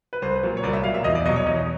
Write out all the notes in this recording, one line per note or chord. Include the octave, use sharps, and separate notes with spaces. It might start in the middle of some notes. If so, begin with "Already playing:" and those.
B4
C2 C5
A#2 F#3
C#5
C2 D5
E5
A#2 F#3 F5
E5
E2 D#5
D5
B2 F#3 D#5
C#5
E2 D#5